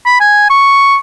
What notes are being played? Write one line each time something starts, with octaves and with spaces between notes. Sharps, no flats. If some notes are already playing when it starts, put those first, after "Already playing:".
B5
G#5
C#6